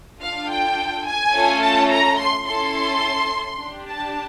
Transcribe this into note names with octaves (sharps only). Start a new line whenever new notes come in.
D4 F4 A4 F5
G5
G#5
A3 C#4 F4 A4
A5
A#5
C6
C#4 E4 A4 C6
D4 G4
A5